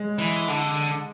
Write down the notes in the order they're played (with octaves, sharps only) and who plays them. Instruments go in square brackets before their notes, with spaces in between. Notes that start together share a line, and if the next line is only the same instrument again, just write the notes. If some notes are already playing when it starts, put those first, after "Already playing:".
Already playing: [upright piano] G#3
[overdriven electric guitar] E3
D3